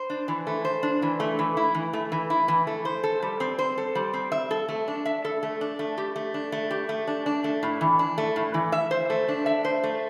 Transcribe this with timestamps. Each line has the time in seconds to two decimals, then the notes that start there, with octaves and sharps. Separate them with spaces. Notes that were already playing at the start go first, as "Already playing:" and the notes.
Already playing: C5
0.10 D4
0.28 E3
0.47 A3
0.65 C5
0.83 D4
1.02 E3
1.20 A3
1.39 E3
1.57 E4
1.75 E3
1.93 A3
2.12 E3
2.30 E4
2.48 E3
2.67 A3
2.85 C5
3.03 A4
3.22 G3
3.40 C4
3.59 C5
3.78 A4
3.95 G3
4.14 C4
4.32 E5
4.51 A4
4.69 A3
4.88 D4
5.05 E5
5.25 A4
5.43 A3
5.61 D4
5.79 A3
5.98 G4
6.16 A3
6.34 D4
6.52 A3
6.71 G4
6.89 A3
7.07 D4
7.26 D4
7.44 A3
7.63 A2
7.81 E3
7.99 D4
8.18 A3
8.36 A2
8.54 E3
8.72 E5
8.91 C5
9.10 A3
9.28 D4
9.46 E5
9.65 C5
9.84 A3